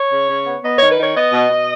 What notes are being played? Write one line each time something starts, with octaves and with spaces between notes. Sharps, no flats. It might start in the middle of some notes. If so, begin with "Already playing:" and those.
Already playing: C#5
C#3
C#3
B3
B3 D#5
D#3 C#5
B4
D#3 C#5
B3 D#5
B2
B2